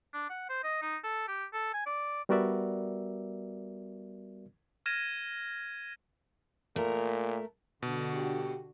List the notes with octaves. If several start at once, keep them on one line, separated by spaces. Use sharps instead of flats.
D4
F#5
C5
D#5
D#4
A4
G4
A4
G#5
D5
G3 B3 F#4 A#4 D5 E5
F6 G#6 A#6 D#7 E7
A#2 A3 A#4
B2 D3 F#4
G4